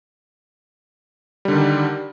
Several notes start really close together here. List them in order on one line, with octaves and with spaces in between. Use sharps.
G3 D3 D#3